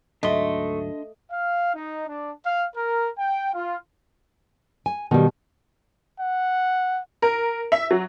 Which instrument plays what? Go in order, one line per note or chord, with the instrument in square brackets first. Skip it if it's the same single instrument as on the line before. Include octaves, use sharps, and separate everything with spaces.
[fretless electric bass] D2 G#2 F#3 [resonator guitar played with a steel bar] A3 [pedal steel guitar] D4 C6 [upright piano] D#5
[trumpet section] F5
D#4
D4
F5
A#4
G5
F4
[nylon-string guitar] G#5
[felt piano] B2 [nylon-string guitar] D#3 G3
[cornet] F#5
[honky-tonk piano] A#4
E5
F#3